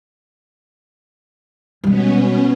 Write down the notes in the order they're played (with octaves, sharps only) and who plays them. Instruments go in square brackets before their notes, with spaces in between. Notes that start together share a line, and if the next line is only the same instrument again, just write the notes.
[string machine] B2 B3 C#4 [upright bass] G3 G#3